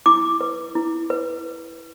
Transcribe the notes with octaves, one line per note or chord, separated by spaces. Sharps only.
E4 D6
B4
E4
B4